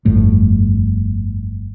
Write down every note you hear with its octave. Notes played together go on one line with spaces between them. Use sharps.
G1 F2 A2